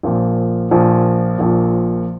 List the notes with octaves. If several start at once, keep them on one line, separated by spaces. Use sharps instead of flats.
A#1 A#2 F3
A#1 A#2 F3
A#1 A#2 F3